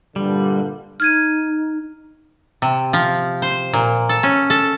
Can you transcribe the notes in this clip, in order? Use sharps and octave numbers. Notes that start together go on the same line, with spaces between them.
G2 A#2 D3 G3
D#4 F6 G#6 D#7
C3
F3
C5
A#2
A4
C#4
A4